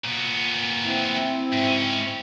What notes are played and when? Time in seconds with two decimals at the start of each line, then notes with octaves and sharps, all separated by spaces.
0.05 A#2 B3
0.84 C4 E4
1.52 G#2 C#4